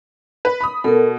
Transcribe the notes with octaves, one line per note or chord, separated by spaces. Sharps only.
B4
B5 D#6
B2 A4 A#4